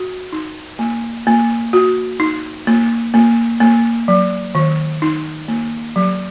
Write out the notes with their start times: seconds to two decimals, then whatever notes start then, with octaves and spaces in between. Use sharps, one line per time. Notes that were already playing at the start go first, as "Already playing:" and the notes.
Already playing: F#4
0.33 D#4
0.79 A#3
1.27 A#3
1.73 F#4
2.20 D#4
2.67 A#3
3.14 A#3
3.61 A#3
4.08 F#3
4.55 D#3
5.02 D#4
5.48 A#3
5.96 F#3